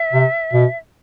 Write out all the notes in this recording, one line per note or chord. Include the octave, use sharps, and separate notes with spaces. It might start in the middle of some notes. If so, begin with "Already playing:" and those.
Already playing: E5
C3
B2